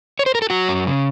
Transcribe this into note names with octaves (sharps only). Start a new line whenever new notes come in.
C#5
C5
A#4
A4
F#3 F#4
F#2
C#3